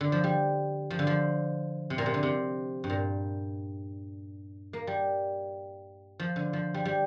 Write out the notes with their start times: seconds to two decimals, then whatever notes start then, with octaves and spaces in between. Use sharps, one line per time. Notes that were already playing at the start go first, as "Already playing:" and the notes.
0.01 D3
0.12 F3
0.24 G3
0.90 F3
0.99 D3
1.07 F3
1.90 C3
1.98 A#2
2.06 C3
2.14 D3
2.23 C3
2.84 G2
2.90 A#2
4.73 A#3
4.87 G3
6.19 F3
6.36 D3
6.53 F3
6.74 G3
6.85 G3